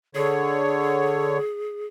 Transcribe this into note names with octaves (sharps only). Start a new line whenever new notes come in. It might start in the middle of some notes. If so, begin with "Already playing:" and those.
D3 G#4 C#5